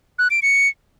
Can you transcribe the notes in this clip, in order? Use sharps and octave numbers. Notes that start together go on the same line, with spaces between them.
F#6
D7
C#7